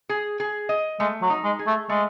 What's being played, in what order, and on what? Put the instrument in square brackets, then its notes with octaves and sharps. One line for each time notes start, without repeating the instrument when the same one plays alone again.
[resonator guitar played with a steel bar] G#4
G#4
D#5
[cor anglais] G#3 [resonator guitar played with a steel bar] A3
[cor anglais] F#3
[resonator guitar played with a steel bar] D#4
[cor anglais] G#3
[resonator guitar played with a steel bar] G#4
[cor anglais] A3
[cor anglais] G#3 [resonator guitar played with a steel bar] A3